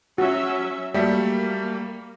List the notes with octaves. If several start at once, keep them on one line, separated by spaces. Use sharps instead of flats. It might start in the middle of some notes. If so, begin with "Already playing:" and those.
F#3 C#4 F#4 E5
F#3 G3 A3 A#3